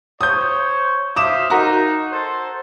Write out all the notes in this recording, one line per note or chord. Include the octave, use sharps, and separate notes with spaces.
C5 C#5 D#6 G6
C5 E5 F5 D6 D#6 E7
D#4 F#4 A#4
A4 C5